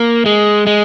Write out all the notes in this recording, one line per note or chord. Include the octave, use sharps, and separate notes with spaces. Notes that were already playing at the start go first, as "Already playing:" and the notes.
Already playing: A#3
G#3
G#3